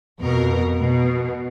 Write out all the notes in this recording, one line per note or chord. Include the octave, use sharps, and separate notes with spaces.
F2 B2 A#4
B2